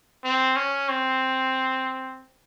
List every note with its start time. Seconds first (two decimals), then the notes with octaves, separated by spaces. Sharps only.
0.24 C4
0.56 C#4
0.89 C4